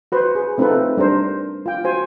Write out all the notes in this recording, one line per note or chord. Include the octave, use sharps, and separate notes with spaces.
F#4 B4 C5
G#4
A3 C4 D#4 F4 A4 B4
G3 D4 A#4 C5
F4 G5
F#4 C5 G#5